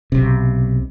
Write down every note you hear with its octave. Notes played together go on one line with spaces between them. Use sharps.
B1 C3